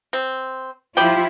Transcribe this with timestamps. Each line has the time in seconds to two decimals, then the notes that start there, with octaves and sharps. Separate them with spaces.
0.13 C4
0.97 F3 G3 E4 F4 D5 G5